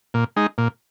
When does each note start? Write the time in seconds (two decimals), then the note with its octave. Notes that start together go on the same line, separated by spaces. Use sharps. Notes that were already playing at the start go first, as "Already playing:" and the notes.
0.14 A#2
0.36 G#3 D#4
0.58 A#2